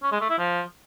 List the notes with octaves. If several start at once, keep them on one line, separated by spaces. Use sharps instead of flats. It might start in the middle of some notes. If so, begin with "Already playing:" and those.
C#4
G#3
A3
E4
F3